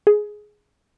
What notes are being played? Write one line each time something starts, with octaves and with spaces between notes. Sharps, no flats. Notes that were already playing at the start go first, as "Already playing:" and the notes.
G#4